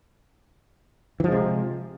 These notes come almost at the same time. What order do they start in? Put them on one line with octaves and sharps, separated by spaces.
E3 F3 G#3 C3